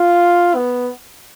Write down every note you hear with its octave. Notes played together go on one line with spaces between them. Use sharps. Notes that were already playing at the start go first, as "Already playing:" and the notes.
Already playing: F4
B3